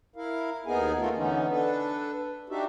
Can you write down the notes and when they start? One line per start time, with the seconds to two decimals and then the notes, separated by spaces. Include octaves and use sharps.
0.16 E4 A#4 F5
0.66 D#2 B3 D#4 G#4 A#4 G#5
0.98 A3 A#3 F4 A4 A#4
1.16 D3 E3 B3 C#4 D#4
1.50 D4 A4 B4
2.49 D4 D#4 F#4 G4 E5